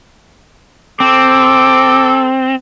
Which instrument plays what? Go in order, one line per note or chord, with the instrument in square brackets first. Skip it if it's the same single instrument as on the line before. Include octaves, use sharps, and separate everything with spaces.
[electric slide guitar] C4 [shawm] A4 [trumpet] D6